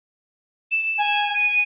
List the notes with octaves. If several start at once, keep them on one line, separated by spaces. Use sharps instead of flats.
E7
G#5
D#7